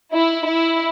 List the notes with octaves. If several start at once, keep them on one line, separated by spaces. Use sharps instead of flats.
E4
E4